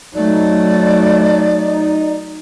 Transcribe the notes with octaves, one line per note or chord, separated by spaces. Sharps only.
F#3 A3 D#4 D5